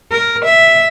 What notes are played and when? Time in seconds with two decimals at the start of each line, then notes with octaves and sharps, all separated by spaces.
0.11 A#4
0.45 E5